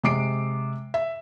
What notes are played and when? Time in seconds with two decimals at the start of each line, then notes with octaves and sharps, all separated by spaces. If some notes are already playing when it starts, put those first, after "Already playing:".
0.03 C3 G#3 D6 C7 D7
0.94 E5